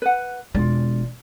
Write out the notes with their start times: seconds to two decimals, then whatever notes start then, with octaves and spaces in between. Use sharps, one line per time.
0.02 B4 F#5
0.55 E1 G#3 F4 D5